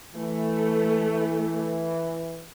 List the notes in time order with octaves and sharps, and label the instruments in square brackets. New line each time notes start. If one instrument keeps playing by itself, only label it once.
[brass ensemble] E3 [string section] A3